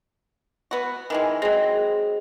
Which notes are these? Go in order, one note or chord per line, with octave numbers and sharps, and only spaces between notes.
B3 F#4
D#3 E3 G#3
F#3 C4 G#4 D#5